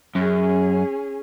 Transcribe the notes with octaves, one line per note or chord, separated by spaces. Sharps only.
F#2 C#4 G#4